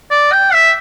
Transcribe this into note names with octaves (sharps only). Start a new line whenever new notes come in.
D5
G5
E5